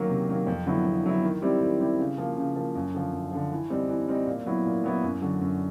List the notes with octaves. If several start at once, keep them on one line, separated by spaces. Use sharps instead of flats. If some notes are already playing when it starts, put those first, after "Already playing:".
Already playing: D#3 F#3 A#3
C3
D#3 F#3 A#3
F2
D3 F#3 B3 E4
F2
D3 F#3 B3 E4
D#3
G3 C4 E4 G4
D#3
G3 C4 E4 G4
C#3
F3 A#3
C#3
F3 A#3
F#2
D3 F3
F#2
D3 F3
E3
G3 C4 D#4
E3
G3 C4 D#4
A#2
F#3 B3 E4
A#2
F#3 B3 E4
F#2
D3 F#3
F#2